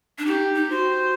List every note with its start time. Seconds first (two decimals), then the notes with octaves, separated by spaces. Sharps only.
0.18 D4
0.25 D#4 G4
0.55 D#4
0.70 F#4 C5